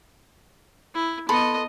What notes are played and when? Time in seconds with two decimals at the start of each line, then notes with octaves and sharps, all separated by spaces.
0.95 E4
1.29 B3 A4 D#5 B5 C6